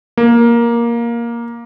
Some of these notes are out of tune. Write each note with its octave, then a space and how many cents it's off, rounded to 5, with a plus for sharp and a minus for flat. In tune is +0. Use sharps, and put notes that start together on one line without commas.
A#3 +10